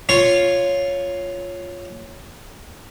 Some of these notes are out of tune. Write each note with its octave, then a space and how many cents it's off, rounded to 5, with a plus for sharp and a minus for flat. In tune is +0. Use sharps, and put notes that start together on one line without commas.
F4 +0 C#5 +0